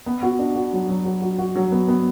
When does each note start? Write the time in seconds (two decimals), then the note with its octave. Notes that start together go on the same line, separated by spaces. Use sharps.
0.06 B3
0.23 F#4
0.39 D4
0.56 F#4
0.73 F#3
0.89 F#3
1.05 F#3
1.22 F#4
1.39 F#4
1.56 F#3
1.72 B3
1.88 B3